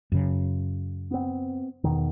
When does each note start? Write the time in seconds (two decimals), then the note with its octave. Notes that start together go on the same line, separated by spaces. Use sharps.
0.12 F#2 C#3
1.11 B3 C4
1.84 E2 B2 D#3